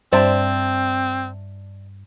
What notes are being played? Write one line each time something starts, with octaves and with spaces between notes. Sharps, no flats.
G2 C4 C5 D5 E5 A5